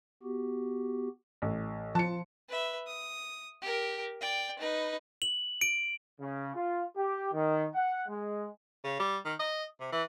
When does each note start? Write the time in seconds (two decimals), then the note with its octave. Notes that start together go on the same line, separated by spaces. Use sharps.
0.23 B3 F#4 G4
1.42 A1
1.95 F3 A5 C#7
2.49 B4 E5
2.87 D#6
3.62 G4 A#4
4.21 D5 G5
4.59 D#4 B4
5.22 F#7
5.61 D7
6.20 C#3
6.55 F4
6.97 G4
7.33 D#3
7.74 F#5
8.09 G#3
8.84 C#3
9.00 G3
9.25 D#3
9.40 D#5
9.81 C3
9.92 E3